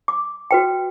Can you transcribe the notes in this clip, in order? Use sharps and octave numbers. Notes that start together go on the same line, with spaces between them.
D6
F#4 B4 G5